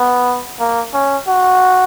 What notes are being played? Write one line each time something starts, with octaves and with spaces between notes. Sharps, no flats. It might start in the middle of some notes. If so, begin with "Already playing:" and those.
Already playing: B3
A#3
C#4
F#4